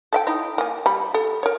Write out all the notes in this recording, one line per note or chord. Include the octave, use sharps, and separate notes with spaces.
A4 E5 G5
D#4 E4 D#5
A#3 G#5
G3 B5
A4
A#4 C#5